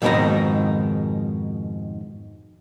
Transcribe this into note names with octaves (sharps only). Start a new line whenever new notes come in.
F2 G#2 B2 D#3 G#3 A#5